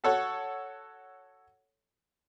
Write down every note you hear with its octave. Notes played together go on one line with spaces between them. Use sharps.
F#4 A4 C#5 F#5